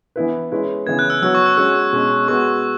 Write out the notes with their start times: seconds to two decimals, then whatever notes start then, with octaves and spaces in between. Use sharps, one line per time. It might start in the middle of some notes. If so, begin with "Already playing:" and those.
0.16 E3 B3 E4 B4
0.52 G#3 C#4 E4 B4
0.86 C#3 E3 B3 G#6
0.99 F#6
1.10 E6
1.22 F#3 B3 F#4 C#5 E6
1.35 C#6
1.46 E6
1.57 G#3 C#4 F#4 C#5 E6
1.93 B2 G#3 C#4
2.28 G#3 B3 F#4 C#6